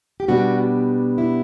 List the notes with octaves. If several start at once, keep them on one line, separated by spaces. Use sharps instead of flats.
G4
B2 G3 B3 D4 F#4
E4